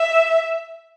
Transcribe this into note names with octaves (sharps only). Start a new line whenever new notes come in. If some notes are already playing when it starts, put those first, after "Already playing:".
Already playing: E5